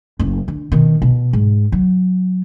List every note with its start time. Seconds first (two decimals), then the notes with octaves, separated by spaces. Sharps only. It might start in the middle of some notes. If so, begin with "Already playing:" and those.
0.19 F#1
0.48 D3
0.72 B2 D#3
1.02 B2
1.33 G#2
1.72 F#3